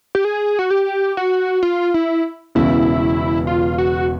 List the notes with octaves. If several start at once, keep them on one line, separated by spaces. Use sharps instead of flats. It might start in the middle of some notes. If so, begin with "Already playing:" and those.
G4
G#4
F#4
G4
F#4
F4
E4
E1 E2 C#3 E4
F4
F#4